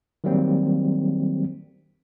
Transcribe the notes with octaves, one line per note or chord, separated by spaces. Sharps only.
D#3 F#3 G3 A#3 C4